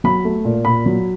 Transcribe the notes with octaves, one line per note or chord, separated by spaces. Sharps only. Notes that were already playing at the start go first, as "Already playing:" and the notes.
F#3 B5
A3
A#2
A#2 B5
F#3